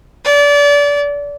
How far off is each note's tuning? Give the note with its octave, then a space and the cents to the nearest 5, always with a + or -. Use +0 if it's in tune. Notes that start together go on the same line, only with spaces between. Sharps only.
D5 -30